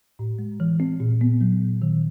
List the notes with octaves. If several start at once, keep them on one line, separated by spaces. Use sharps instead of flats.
A2
G#3
E3
C4
A#2
B3
F#3
A#2
D#3